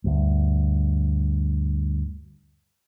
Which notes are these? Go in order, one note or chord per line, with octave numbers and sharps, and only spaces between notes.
D2 G2